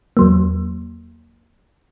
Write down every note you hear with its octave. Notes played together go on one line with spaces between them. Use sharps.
E2 F#3 A#3